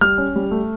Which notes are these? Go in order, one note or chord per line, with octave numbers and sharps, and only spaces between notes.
G3 F6
C#4
G3
A3